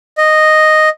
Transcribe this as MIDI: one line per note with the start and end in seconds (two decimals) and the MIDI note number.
0.18 0.89 75